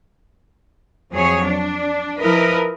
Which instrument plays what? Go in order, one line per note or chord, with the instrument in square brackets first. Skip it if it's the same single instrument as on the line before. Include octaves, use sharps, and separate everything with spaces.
[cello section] F2 F#3 G#4 C#5
D4
F3 E4 A#4 B4 D#5